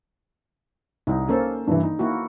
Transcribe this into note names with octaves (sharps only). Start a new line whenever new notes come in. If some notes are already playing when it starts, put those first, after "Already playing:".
C2 D#4
A#3 C#4 A4 A#4 C5
G2 E3
D#4
A#3 E4 F#4